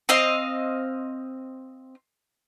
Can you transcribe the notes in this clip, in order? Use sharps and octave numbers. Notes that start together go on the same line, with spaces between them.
C4 D#5 F5